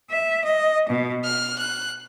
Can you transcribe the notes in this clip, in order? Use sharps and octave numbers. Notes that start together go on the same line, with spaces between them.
E5
D#5
B2
F6
F#6